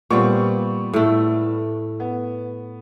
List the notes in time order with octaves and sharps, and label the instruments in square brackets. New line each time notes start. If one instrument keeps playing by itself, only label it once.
[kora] A#2 C4 [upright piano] G3 B3 C#6
[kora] A2 A3
[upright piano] B3